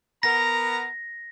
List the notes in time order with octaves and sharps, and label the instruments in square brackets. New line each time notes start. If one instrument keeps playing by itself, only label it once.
[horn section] B3 A#4 A#5 [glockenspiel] A#6